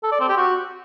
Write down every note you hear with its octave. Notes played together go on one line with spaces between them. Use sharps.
A4
D5
C4
G4
F#4